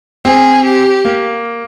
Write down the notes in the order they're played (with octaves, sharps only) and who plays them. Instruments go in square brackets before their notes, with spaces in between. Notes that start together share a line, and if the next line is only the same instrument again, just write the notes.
[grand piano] C4 [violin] G#4
[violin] G4
[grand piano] A#3